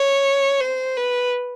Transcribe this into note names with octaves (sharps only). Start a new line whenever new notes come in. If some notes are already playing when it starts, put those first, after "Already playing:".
Already playing: C#5
C5
B4